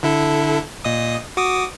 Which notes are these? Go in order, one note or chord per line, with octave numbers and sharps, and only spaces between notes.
D3 E4 A4
A#2 D#5 D#6
F#4 D6 D#6